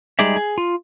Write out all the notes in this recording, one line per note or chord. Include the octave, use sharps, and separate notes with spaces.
G3 G#3 D#4 G#4 D5 E5
G#4
F4